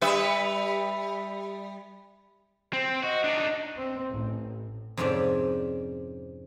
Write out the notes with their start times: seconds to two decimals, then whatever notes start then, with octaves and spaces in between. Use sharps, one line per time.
0.01 G3 B4 E5
2.73 C4 C5
3.03 F#4 D#5
3.24 D4 D#4
3.77 C4
4.11 A1
4.97 F2 G#2 C3 C#4 D5 E5